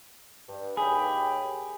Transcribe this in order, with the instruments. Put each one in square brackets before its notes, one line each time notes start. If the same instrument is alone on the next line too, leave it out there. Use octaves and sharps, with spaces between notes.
[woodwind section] G2
[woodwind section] D#2 G4 B5 [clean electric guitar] G#4